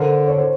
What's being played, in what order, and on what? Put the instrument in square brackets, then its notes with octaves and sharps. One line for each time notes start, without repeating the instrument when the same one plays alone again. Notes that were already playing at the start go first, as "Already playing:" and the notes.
Already playing: [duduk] D3 [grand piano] A#4 C5
[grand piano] C#5
C5